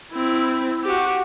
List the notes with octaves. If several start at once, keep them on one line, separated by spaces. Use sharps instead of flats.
C4 E4
F#4 G4